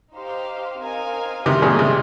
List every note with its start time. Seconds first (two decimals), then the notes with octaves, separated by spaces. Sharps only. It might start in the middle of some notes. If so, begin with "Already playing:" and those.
0.15 D#4 G4 C5 F5
0.81 C4 D#4 A#4 F5 G#5
1.46 C3 D#3 C#4 G#4 D#5 G5
1.62 A#2 C#3
1.79 C3